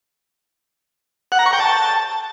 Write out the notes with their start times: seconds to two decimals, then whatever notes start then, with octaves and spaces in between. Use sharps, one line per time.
1.32 F#5
1.39 A#5
1.46 C#6
1.53 G5
1.60 A5